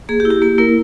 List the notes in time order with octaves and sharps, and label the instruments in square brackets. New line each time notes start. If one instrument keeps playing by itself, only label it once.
[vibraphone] A#3 G#4
G4
E4
G4
A#3 G4
A#3 E4 A#4